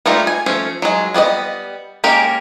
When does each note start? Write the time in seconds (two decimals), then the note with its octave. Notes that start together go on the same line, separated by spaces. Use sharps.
0.06 G3 A3 A#3 D#4 F4
0.27 G#5
0.46 F3 A3 C#4
0.82 F#3 G#3
1.14 G3 B3 D5 D#5
2.04 G#3 A#3 C#4 G4 A#4